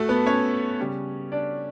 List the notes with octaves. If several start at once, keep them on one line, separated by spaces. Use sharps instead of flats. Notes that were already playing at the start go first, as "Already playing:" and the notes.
Already playing: A3 F#4 A4
B3 B4
C#4 C#5
C#3 G3 C#4
D4 D5